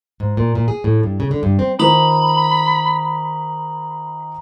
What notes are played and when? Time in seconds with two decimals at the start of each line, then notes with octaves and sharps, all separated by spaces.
0.20 G#2
0.37 A#2
0.55 A#2
0.68 G#4
0.84 A2
1.03 G2
1.20 C#3
1.31 D3
1.43 G2
1.59 C4
1.79 D#3 F4 C5 A#5 B5 D#6 F#7